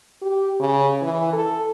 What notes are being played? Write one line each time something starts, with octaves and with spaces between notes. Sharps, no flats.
G4
C#3
E3
A4